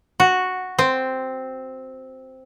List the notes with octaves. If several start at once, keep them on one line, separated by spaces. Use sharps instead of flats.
F#4
C4